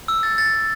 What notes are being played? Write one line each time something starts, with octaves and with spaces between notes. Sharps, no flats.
E6
A6
A6
A6